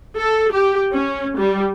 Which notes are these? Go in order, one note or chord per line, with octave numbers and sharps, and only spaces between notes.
A4
G4
C#4
G3